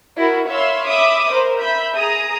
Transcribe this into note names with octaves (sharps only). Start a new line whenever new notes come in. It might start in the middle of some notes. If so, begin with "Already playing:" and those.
E4 F#4 A#4
C#5 E5 F5 B5 C6 E6
E5 B5 D6 D#6
A#4 C5
E5 B5 G6
G#4 A#5 D#6